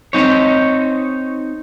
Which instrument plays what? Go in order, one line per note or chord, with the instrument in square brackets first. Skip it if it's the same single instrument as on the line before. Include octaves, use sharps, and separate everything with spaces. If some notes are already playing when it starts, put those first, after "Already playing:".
[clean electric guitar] C4 D#4 C#5